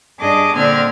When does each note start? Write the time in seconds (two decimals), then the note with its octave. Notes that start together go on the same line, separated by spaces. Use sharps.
0.19 G2 D4 G#4 D#5 A5 D6
0.55 A#2 D3 C4 D4 F6 G#6